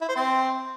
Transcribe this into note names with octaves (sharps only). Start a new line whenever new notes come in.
E4
C5
C4